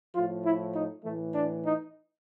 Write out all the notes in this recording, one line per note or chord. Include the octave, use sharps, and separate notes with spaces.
A2 F3 F4
E4
D#4
A2 E3 A3
D4
D#4